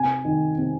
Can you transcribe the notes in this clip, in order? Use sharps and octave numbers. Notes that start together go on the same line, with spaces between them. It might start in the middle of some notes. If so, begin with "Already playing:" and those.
Already playing: C3 G#5
D#3
C3